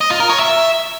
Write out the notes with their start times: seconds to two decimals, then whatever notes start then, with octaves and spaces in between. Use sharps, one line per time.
0.01 D#5
0.10 F4
0.20 A#4
0.30 C#5
0.39 E5